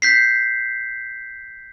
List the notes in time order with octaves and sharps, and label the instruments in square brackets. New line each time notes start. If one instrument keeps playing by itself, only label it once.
[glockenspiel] G6 B6 C7